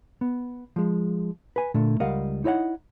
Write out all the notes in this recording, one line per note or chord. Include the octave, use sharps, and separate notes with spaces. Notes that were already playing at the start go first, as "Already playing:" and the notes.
B3
F3 G#3
B4 G#5
A#2 D3 A3
C#2 G3 A#4 D#5 F5 F#5
D#4 E4 C#5 D#5 F#5